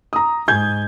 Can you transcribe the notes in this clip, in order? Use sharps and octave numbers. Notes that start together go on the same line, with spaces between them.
A#5 D#6
G#2 G#5 G6 G#6